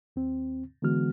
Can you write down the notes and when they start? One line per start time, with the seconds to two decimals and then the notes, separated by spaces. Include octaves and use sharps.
0.16 D#2 C4
0.82 D3 E3 G#3 B3 F#4 F6